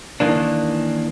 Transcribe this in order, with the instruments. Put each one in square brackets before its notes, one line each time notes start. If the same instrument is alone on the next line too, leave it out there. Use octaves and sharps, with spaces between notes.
[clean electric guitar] D#3 E3 A#3 D4